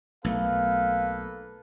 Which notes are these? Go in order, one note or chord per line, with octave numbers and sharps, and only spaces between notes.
B1 A3 A#3 A4 B4 F5